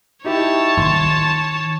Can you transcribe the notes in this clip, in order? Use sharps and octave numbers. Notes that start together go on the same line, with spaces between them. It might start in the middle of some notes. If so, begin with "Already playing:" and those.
D#4 E4 G4 C#5 A5
D#3 C6